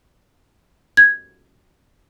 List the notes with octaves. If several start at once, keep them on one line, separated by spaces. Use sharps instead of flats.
G#6